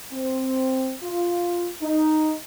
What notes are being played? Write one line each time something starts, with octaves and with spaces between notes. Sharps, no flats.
C4
F4
D#4